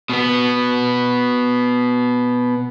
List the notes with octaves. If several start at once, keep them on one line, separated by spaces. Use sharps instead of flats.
B2 B3